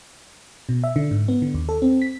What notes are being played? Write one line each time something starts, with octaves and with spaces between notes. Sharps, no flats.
B2
E5
D3
G#2
B3
D3
D#2
A4
C4
B6